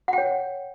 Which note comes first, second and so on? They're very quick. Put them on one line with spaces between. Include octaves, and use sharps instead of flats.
F#5 G5 C#5